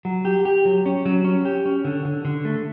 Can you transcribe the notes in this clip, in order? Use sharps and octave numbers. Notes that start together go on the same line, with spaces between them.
F#3
G4
G4
F#3
C#4
F#3
C#4
G4
C#4
D3
D3
D3
A3